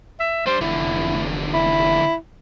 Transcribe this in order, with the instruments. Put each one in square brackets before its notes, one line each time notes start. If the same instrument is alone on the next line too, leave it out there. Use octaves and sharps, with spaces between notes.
[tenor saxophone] E5
[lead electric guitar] G3 D4 [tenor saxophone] C5
[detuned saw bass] F1 [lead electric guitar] E2 D3 [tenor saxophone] E4
[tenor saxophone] E4